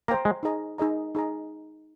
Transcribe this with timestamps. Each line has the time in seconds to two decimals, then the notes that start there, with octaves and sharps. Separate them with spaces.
0.08 A#3 C5 G5 A#5
0.25 G#3
0.43 D#4 G#4 D#5 A#5
0.78 D#4 G#4 D#5 A#5
1.15 D#4 G#4 D#5 A#5